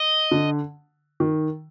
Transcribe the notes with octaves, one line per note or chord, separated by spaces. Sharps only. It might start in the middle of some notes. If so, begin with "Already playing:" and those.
Already playing: D#5
D3
D#3